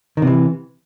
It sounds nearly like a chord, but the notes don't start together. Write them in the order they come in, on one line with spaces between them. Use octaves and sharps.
D#3 C3 E3